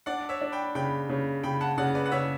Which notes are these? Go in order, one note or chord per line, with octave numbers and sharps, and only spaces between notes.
D4 D5 F#5
C#5 E5
D4
G5 B5
C#3 G5 B5
C#3
C#3 G5 B5
F#5 A5
C#3 D5 F#5
B4 D5
F#5
C#3 C#5 E5